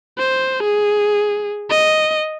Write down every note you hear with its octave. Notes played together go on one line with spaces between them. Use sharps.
C5
G#4
D#5